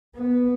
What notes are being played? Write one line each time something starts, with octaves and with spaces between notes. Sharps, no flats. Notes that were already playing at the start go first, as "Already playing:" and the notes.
B3